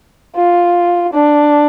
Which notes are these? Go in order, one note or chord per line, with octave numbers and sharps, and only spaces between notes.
F4
D4